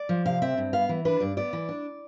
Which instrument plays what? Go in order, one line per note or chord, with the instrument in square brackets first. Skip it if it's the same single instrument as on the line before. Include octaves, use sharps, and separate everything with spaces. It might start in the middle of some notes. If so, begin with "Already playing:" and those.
Already playing: [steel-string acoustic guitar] D5
F3
C3 F5
C4 E5
G2
B3 F5
E3
D4 B4
G2 D5
B3 D5
E3
D4